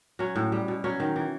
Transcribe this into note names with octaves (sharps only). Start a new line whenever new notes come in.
F#3 C#4
A2
G3
B2
F#3 C#4
D#3
E3